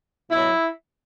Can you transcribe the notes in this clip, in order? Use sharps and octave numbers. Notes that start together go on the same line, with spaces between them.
B2 F#3 E4